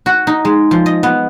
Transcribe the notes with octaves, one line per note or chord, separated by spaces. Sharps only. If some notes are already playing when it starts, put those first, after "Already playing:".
F#4
D#4
G#3
F3
D#5
B3